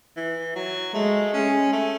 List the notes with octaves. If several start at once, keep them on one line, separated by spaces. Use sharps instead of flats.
E3
F#3
G#3 A3
C#4
A3